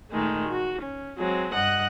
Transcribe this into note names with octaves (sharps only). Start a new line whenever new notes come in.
A#2 D#3 G#3 A3
F#4
C#4
F#3 G#3 C4
G2 D#5 F#5 F#6